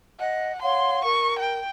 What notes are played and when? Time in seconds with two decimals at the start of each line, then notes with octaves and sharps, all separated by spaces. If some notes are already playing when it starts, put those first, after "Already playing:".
0.20 D#5 F#5
0.62 C#5 F5 F#5 C6
1.04 A#4 C#6
1.39 G5